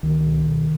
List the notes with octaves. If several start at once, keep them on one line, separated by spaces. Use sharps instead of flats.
C#2 D#3
B2
B2